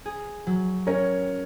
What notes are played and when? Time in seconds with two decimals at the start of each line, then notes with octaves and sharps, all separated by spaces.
0.05 G#4
0.47 F#3
0.87 C#4 A#4 C#5